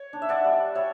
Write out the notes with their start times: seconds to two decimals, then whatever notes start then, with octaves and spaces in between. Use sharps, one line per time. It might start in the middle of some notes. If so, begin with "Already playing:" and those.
Already playing: C#5
0.13 D4
0.22 E5
0.29 D5 F#5
0.45 G3
0.75 G3 C#5 E5